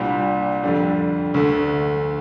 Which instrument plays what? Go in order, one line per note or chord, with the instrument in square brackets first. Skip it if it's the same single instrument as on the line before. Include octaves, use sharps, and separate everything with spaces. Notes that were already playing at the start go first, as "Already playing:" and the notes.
Already playing: [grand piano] C2 A#2 G3 D4 G4
F2 D3 G3
D2 D3 A3